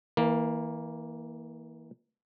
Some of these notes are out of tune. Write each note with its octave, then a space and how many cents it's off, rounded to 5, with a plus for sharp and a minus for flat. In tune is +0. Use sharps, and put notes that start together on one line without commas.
E3 -30 A#3 +0